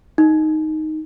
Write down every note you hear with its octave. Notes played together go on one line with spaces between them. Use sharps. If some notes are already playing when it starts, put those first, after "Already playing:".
D#4